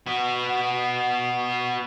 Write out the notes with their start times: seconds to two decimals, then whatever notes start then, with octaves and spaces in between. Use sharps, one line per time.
0.06 B3 F#4